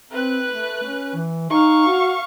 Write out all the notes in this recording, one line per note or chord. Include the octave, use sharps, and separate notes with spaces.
C4 B4 F#6
A3
C#4
E3
D#4 F5 C#6
F#4